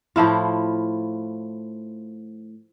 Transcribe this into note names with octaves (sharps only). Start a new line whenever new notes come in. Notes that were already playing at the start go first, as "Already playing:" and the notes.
A2 F3 E4 F4